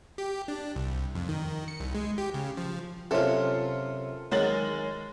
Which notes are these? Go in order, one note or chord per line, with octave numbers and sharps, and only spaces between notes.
G4
D4
C2
F2
D#3
C#7
C2
G#3
G4
C#3
F3
F#2 C3 F4 A4
D#3 F#3 G#3 A6 F#7